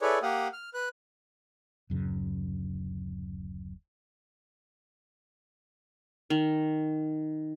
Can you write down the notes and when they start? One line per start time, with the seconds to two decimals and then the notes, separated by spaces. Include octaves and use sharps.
0.01 E4 G#4 A4 B4 C#5 D5
0.22 A#3 G4 F5 F#5 D#6
0.53 F6
0.74 B4 F#6
1.90 D1 F#2 C#3
6.30 D#3